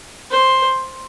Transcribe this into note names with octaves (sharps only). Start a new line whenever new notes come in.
C5